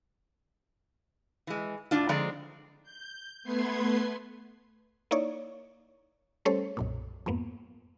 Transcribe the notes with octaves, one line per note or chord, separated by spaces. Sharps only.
E3 G#3
A2 D4 F4
D3 F3 G#3 C4 D5 A#5
G6
A3 B3 B4 C6 G#6 C7
A#3 D#4 E4 C#5 D5
G3 A3 C#4 A4 C5 C#5
B1 F#2 A#2
F2 G#2 A#3 B3